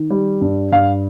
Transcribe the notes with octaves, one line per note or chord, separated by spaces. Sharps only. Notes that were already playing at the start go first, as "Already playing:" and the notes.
Already playing: D#3
G3
G2
G2 F5